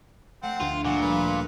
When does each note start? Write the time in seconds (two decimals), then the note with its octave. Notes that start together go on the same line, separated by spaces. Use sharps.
0.43 A3 C4 F#5
0.60 D2 F4
0.85 A#2 F3 A#3 F#4
1.01 G3 B4 F5
1.29 A#4